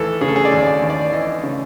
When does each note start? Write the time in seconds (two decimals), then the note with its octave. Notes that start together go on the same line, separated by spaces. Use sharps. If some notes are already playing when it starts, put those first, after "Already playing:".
Already playing: D#2 E3 A4
0.21 C#3 G#4
0.28 A4
0.36 G#4
0.45 D5
0.52 D#2
0.67 D5
0.82 D#2
0.90 D5
1.12 E3 D#5
1.43 C#3